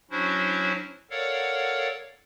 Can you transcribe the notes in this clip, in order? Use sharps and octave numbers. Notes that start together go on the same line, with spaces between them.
F#3 C#4 D4 E4 F#4 C5
A4 A#4 C#5 D5 F5 F#5